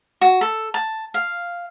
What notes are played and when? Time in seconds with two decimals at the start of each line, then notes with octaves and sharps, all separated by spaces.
0.21 F#4
0.41 A4
0.74 A5
1.14 F5